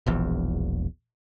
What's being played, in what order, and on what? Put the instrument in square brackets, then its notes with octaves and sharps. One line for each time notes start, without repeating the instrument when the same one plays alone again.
[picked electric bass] E1 A#1 E2